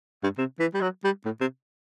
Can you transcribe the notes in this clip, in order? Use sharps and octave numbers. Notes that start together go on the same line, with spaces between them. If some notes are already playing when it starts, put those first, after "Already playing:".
G2
C3
E3
G3
F#3
G3
A2
C3